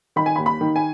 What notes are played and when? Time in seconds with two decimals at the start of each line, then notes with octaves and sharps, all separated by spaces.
0.16 D#3 B5
0.26 G#5
0.36 D#2 B5
0.46 B5
0.61 D#3
0.76 G#5